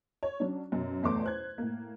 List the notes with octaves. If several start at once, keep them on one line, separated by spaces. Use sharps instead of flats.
C#5
F#3 C#4 D4
F#2 B2
A1 E2 A3 C6 D6
C5 F#6 G#6
A2 A#3